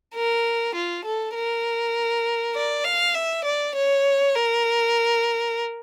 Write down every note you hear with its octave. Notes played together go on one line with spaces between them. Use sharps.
A#4
F4
A4
A#4
D5
F5
E5
D5
C#5
A#4